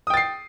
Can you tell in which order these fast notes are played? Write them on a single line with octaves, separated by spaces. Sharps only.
D#6 G5 A6 C7